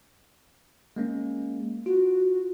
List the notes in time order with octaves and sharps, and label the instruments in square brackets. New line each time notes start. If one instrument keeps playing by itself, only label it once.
[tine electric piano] G#3 A#3 C#4
[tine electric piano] F4 [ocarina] F#4